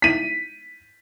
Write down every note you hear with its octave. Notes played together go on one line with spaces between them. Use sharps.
B6 D#7